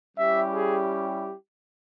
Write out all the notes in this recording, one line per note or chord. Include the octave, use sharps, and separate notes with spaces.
G3 C#4 E4 G4 E5
G#4